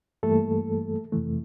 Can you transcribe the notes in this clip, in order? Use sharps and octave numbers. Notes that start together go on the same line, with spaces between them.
G2 E3 G3 A3 A#3 A4
F2 C3 E3 A3